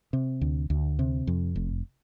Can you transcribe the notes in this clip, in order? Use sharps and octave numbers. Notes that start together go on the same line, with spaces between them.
C3
D2
D2
C3
F2
F1